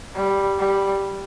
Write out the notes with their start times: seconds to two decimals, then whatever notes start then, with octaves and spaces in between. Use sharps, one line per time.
0.15 G3
0.58 G3